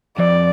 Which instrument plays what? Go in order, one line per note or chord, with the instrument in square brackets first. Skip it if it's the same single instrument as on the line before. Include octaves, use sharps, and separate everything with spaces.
[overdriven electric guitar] F2 [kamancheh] D5